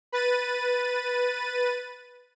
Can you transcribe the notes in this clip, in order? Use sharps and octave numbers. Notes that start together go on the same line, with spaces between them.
B4 A6 D#7